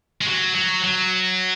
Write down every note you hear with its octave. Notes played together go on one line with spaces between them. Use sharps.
G#3
F#3
F#3
F#3